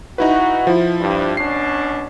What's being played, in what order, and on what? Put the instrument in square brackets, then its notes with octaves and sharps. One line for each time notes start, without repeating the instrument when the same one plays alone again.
[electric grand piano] D#4 E4 B4 [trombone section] F#4
[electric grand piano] F3 E4
[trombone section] G2
[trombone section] B2 C#4 D4 [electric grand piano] C7